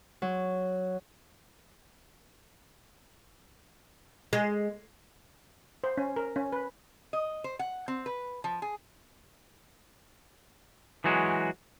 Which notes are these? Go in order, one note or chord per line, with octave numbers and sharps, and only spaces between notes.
F#3
G#3
C5
C#4
A#4
C#4
B4
D#5
C5
F#5
C4
B4
F3
G#4
E3 F#3 G#3 F#4